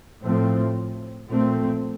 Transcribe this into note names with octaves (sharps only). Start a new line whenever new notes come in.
A2 F3 A3 C4
A#2 F3 A3 C4